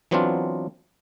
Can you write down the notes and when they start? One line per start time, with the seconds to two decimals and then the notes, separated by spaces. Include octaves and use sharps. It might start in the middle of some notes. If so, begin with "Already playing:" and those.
0.11 E3 F#3 B3 C4 D4 F4